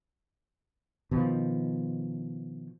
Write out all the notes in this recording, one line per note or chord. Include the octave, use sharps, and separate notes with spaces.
B2 D#3 F3